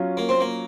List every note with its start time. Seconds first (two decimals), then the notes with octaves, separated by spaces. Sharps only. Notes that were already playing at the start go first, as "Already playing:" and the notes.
Already playing: F#3 C#4 F4
0.17 A#3
0.29 C4
0.40 A#3